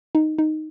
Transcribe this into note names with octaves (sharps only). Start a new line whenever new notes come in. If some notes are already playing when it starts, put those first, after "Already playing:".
D#4
D#4